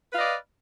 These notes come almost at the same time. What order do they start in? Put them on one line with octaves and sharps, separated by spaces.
B4 F5 D#5 D5